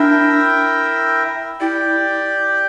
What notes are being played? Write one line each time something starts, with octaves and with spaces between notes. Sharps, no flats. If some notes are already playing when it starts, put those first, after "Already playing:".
Already playing: D4 E4 A#4 E5 G5
E4 G4 D5 G5